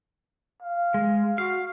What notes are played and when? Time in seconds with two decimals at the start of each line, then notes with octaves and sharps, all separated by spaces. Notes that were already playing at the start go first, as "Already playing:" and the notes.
0.62 F5
0.94 G#3
1.38 F#4 F5